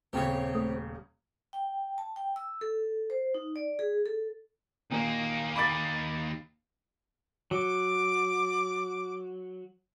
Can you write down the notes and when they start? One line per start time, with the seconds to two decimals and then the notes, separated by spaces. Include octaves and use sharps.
0.13 D#1 C#3 C4 G4 C#5
0.55 A3
1.53 G5
1.98 A5
2.16 G5
2.36 E6
2.61 A4
3.10 C5
3.35 D#4
3.56 D5
3.79 G#4
4.06 A4
4.91 D#2 A#2 A#3
5.56 B5 D6 A6
7.51 F#3 D6